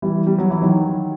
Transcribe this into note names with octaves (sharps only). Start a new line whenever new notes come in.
E3 G3
G3
F#3
E3
D#3 F#3